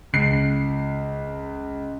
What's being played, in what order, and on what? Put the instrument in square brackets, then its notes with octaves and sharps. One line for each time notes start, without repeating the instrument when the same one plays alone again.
[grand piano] C#2 C7